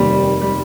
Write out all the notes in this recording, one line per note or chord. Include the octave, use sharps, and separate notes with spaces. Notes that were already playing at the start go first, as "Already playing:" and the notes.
Already playing: F1 D#2 D#3 G3
G3